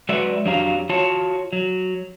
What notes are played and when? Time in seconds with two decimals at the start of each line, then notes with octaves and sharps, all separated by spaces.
0.09 F#3 G#3 F#4 B4 D5 E5
0.45 F2 F#3 D4 G4 F5 A#5
0.89 F4 F#4 C#5 A5
1.53 F#3